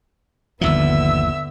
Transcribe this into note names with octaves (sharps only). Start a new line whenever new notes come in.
G1 D#2 D3 F3 B3 E5 E6